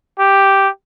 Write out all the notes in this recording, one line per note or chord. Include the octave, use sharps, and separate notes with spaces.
G4